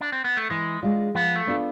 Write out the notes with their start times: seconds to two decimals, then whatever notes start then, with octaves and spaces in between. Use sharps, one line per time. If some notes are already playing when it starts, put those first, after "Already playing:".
0.01 D4
0.12 C4
0.24 B3
0.37 A3
0.50 E3 G#3
0.83 G#3 D4 F4
1.15 F3 B3
1.36 A3
1.47 B3 D4 F4 A4